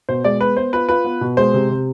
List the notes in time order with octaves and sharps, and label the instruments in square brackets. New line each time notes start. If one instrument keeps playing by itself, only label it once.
[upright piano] B2 [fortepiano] C5
[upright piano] G#3 [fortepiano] D5
[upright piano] B3 [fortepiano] B4
[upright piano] B3 [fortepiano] C5
[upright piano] F4 [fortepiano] B4
[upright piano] F4 [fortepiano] B4
[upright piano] B3
B2
[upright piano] G#3 [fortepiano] C5
[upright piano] C3
C3